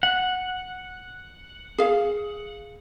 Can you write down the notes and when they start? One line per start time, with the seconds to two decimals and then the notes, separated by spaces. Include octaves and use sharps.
0.03 F#5
1.78 G#4 F5